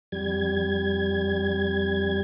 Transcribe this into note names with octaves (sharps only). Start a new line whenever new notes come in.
F2 G3 G#6